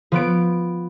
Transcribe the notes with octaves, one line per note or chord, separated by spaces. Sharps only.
F3 B3 D7